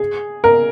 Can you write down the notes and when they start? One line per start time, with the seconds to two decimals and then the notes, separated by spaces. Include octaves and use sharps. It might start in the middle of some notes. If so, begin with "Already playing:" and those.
Already playing: G#4
0.44 A#4